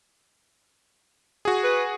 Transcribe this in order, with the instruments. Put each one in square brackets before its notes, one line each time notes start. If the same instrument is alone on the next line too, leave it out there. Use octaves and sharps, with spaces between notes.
[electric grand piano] F#4 G#4
[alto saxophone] B4